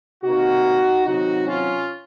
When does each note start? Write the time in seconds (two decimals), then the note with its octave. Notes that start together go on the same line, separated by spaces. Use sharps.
0.23 C3 D#3 A#3 D#4 F#4
1.05 C3 D#3 F#3 D#4 F#4
1.46 C#4 F4